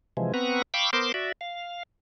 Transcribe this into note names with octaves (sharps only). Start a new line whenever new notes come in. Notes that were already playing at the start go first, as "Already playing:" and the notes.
C3 E3 F3 G#3
B3 C4 B4 F#5 A#5 C#6
F5 G5 B5 C#6 D6 E6
B3 A#4 C5 C6 D6
F#4 D5 E5
F5